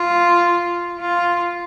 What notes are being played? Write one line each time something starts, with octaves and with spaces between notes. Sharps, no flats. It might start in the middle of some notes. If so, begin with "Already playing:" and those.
Already playing: F4
F4